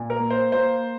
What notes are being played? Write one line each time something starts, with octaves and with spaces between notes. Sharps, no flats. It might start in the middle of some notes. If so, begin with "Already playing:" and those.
Already playing: A#2
A#4
A#3
C5
A#3 C5